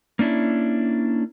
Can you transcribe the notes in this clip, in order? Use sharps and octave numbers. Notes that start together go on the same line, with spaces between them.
A#3 C#4 D4 E4